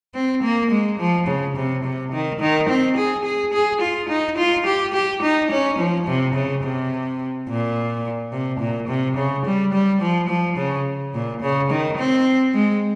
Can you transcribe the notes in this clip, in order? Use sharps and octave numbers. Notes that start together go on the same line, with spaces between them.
C4
A#3
G#3
F3
C#3
C3
C3
D#3
D#3
C4
G#4
G#4
G#4
F4
D#4
F4
G4
G4
D#4
C#4
F3
C3
C#3
C3
A#2
C3
A#2
C3
C#3
G3
G3
F3
F3
C#3
A#2
C#3
D#3
C4
G#3